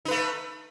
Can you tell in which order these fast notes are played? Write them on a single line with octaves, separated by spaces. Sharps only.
D#4 B4 A3